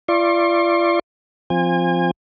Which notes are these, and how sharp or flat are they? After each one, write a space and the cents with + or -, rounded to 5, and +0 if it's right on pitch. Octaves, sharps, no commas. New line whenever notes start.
F4 -40 D5 +0 C6 +45
F3 +0 C4 +0 G#5 -30